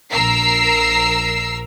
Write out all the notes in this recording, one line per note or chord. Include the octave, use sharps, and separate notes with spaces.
A#1 A#4 A#5 E6 C7